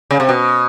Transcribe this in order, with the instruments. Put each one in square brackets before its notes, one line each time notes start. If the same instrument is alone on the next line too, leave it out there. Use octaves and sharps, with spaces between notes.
[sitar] C#3
C3
B2